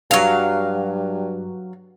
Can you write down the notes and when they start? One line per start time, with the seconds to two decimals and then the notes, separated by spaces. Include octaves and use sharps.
0.11 G2 F#3 F5